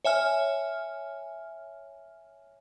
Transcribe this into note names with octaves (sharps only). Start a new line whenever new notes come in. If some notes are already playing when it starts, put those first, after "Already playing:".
C#5 E5 G#5 F6